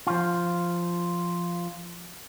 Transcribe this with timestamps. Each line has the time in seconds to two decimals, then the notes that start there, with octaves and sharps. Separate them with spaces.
0.07 F3 F4